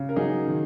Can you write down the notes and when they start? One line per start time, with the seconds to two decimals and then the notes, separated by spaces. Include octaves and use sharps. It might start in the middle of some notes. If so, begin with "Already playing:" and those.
Already playing: C#3
0.09 A#4
0.16 F#3 D#4 G#4
0.48 D#3